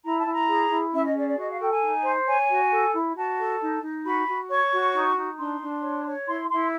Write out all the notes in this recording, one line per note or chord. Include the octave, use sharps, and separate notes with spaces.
E4 A#5
A5
E4
A#5
G#4
E4
C#4 E5
D#5
G#4 D5
D5
F#4 D#5
F5
A4 G5
G#5
D#4
C5
C#5 G#5
F#4
A4
E4
F#4 A5
A4
D#4
D#4
F#4 B5
F#4
C#5 C#6
F#4
D#4
D#4
D4 C6
D4
C#5
C#5
E4 C6
E4 C6